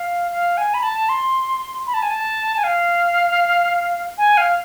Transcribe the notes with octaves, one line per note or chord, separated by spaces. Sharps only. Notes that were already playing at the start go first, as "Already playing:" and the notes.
Already playing: F5
F5
G#5
B5
A5
C6
B5
A5
G#5
A5
G#5
F5
G#5
F5